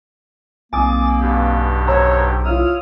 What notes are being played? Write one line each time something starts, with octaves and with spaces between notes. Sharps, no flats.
B1 A#3 C4 G#5 D6 D#6 A6
G2 B2 G4
C5 C#5 A#5 E6
E4 F4 C#5 D#6 F6